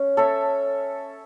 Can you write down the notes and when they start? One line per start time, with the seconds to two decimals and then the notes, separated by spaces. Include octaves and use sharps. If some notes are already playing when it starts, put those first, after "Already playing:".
Already playing: C#4
0.17 A4 C#5 E5